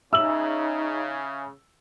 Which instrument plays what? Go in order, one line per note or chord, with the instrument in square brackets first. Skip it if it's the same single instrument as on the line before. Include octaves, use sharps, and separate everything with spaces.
[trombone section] C#3 [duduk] D#4 [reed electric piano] E5 [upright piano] E6 F#7